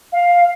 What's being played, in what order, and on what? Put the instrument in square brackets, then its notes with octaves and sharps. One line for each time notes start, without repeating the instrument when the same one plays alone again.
[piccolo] F5